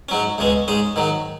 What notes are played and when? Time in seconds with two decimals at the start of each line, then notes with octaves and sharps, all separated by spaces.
0.09 G#2 F#3 C#4
0.38 C#2 B2 G#3 C#4
0.68 G#2 G#3 C#4 G#4
0.96 G#2 D#3 F#3